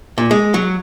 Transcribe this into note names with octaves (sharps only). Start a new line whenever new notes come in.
A#2
G#3
F#3